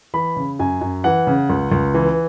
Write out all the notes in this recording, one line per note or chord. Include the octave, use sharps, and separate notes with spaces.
E3 B5
C#3
F#2 G#5
F#2
E3 F#5
C#3
C#2
C#2
E3